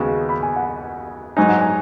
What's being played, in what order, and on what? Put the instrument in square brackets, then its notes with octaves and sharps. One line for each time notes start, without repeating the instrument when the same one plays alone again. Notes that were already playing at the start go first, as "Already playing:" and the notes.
Already playing: [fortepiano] D#2 C#3 G#3 B3 F#4
[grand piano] B5
G#5
F#5
[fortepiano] G#2 F#3 D#4 [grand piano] G#5
[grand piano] F#5
G#5